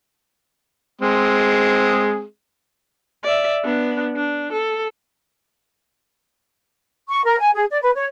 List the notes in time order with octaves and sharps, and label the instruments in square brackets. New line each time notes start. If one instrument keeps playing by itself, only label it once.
[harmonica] G#3 C4 G#4
[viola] D5 E5
B3 D4
D4
A4
[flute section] C#6
A#4
G#5
G#4
D5
B4
C#5